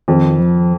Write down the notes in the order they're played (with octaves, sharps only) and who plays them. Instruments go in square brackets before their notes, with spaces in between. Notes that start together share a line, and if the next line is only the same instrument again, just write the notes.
[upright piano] F2 [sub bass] D#3
[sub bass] F3